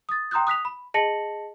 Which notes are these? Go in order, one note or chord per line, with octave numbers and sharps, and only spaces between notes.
D#6 A6
G5 A#5 C6 D#6 F#6 G6
D#6 F#6 B6 F7
B5
G#4 D#5 A5 A#6 C#7 F#7